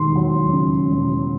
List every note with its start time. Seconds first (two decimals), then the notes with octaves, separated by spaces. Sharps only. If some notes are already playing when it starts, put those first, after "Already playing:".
Already playing: E1 D#2 C6
0.16 F#3
0.53 C#3
0.91 E1